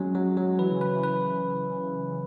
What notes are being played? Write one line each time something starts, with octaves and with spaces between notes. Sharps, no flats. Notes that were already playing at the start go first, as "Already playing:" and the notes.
Already playing: F#3 G#3 C#4
F#3
F#3
E3 B4
C#3
C#3 B4
E3
B4